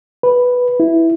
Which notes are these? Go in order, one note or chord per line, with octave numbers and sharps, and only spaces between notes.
B4
E4